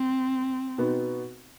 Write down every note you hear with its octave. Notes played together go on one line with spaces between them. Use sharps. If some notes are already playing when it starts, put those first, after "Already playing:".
Already playing: C4
B2 B3 D#4